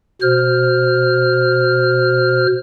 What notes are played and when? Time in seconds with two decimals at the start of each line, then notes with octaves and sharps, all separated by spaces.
0.22 B2 C5 F6